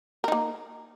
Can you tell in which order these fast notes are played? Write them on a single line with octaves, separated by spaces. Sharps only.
A#4 D#4 A#3